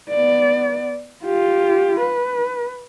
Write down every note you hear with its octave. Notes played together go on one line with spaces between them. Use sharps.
B3 D5
F4 G4
B4